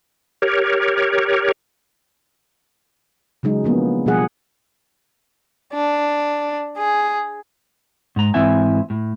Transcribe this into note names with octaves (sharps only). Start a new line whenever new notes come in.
G4 A#4 C#5
C#3 F#3 G#3 D#4
F3 A#3 B3 D4
B2 F3 G3 G#4 F#5
D4
G#4
G#2 A#5
G#2 E3 C4 E4 E5 G#5
A2